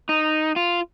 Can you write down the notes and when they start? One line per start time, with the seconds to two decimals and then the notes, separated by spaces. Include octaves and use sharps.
0.09 D#4
0.56 F4